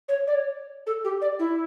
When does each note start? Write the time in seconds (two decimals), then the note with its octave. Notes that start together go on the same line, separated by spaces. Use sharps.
0.09 C#5
0.27 D5
0.35 C#5
0.87 A4
1.04 G4
1.21 D5
1.39 E4